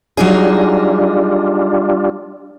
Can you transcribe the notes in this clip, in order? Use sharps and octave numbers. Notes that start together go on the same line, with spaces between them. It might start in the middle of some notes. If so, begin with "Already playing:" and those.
F#3 G3 D4 D#4 F4 G#4